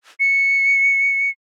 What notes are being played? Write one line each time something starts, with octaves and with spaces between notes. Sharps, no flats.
C#7